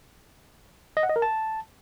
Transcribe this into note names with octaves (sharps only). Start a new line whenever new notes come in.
D#5
F#5
D#5
A#4
A5